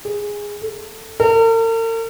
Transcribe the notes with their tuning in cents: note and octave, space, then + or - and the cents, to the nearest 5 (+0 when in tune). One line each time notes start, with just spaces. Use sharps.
G#4 -10
A4 +20
A#4 -45